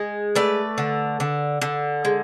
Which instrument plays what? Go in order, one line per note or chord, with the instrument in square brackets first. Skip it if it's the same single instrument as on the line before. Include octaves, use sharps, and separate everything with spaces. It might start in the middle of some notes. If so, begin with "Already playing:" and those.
Already playing: [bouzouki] G#3
A3 B4 D5
D3
D3
D3
G#3